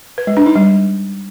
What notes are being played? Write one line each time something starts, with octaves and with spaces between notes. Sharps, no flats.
B4
G#3
D4
D#4
G3